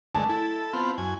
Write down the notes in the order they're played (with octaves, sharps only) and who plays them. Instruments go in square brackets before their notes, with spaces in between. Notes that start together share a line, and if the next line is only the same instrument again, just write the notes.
[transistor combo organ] D3 G#3 [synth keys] F#3 A3 [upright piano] A5
[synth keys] E4 [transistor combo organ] A4
[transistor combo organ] B3 C4 F4
F#2 G#5